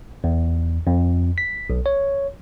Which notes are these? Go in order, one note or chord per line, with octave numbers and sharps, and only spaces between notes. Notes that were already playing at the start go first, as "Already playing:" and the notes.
E2
F2
B6
B1
C#5